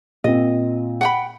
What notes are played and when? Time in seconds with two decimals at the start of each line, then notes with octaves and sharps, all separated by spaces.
0.24 A#2 C4 D#5
1.01 F#5 G5 B5